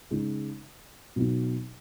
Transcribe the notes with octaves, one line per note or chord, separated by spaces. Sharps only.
C#3 G#3 D#4
B2 F#3 B3 D#4